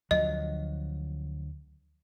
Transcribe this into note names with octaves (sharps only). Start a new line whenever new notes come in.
D2 F3 F#3 D#5